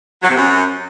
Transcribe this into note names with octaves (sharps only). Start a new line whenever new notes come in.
F#3
C3
F#2